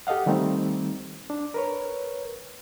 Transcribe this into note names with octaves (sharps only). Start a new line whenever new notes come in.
G4 A4 D#5 F5 F#5
D#3 G3 A3 C4 D#4
D4
A#4 B4 C#5